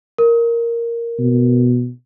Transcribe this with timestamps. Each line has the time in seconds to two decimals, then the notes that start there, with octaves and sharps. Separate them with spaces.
0.18 A#4
1.19 B2